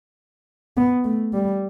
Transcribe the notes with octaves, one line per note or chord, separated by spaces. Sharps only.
B3
A3
G3